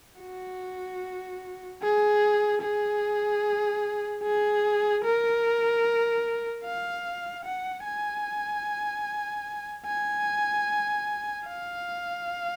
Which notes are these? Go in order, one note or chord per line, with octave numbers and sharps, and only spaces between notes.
F#4
G#4
G#4
G#4
A#4
F5
F#5
G#5
G#5
F5